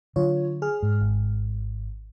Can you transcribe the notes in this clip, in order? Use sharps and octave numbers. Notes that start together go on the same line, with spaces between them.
D3 F#3 F4 C#5
G#4 F6
G#2
G#1